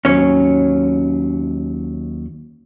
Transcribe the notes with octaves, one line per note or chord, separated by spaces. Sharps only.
D#2 F#3 C#4 C#5